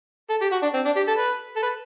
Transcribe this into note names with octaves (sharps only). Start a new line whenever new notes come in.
A4
G4
F#4
D4
C4
D4
G4
A4
B4
A4
B4